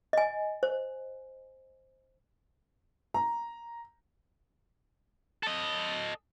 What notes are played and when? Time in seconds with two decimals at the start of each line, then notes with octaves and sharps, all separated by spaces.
0.13 D#5 G#5
0.63 C5
3.14 A#5
5.43 A4 D#5